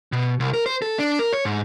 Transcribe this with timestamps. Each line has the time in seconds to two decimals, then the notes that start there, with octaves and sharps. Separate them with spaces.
0.12 B2
0.40 C2
0.53 A#4
0.66 C5
0.82 A4
0.99 D4
1.19 A#4
1.33 C#5
1.45 G#2